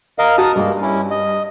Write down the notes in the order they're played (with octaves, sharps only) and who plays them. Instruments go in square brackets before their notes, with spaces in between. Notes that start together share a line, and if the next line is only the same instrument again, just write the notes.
[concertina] A#4 D#5 F5
[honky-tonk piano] F#4 [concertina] A5 A#5 D#6
[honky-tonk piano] G2 [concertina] G#3 A#3
[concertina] C#4 E4
D#5